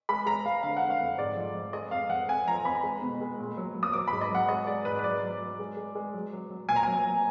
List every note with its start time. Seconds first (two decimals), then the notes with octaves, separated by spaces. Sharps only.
0.09 G#3 B5
0.26 G#3 A#5
0.45 G#3 F5
0.63 D3 F5
0.77 F#5
0.82 D3
0.90 F5
1.01 F2
1.18 G#2 D5
1.36 F3
1.55 F3
1.73 G#3 D#5
1.91 F2 F5
2.10 F2 F#5
2.28 F2 G#5
2.47 F3 A#5
2.65 F2 B5
2.83 G#3
3.01 B2
3.21 G#3
3.38 A#2
3.57 F#3
3.75 F#3
3.83 D#6
3.93 F#3 D6
4.08 G#2 B5
4.21 D#5
4.31 F#3 F#5
4.49 G#3 D#5
4.67 G#3 D5
4.85 G#2 B4
4.99 B4
5.04 F#3 D5
5.23 F#3
5.41 F#3
5.59 G#3
5.77 G#3
5.95 G#3
6.14 F#3
6.33 F#3
6.50 F#3
6.69 A#2 G#5
6.76 A#5
6.83 F#3 G#5
7.05 F#3